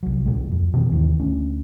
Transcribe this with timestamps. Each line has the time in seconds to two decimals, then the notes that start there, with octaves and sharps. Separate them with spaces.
0.03 C2 F#3
0.26 C#2 A#2 G#3
0.52 F2
0.74 B2 D#3 E3 C4
0.91 D#2 G#2 D#3 E3
1.20 D2 C#4